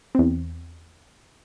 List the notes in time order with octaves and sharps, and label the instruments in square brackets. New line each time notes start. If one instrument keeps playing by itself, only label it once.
[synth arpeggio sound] E2 C4